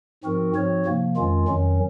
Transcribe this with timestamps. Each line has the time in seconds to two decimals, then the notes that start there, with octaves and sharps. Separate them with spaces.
0.24 G#2 F3 C4 F#4 A#4
0.55 G#2 F3 C4 F#4 C#5
0.85 C3 F3 A#3
1.17 F2 D#3 G#3 C#4 F4
1.48 F2 D#3 F#3 C#4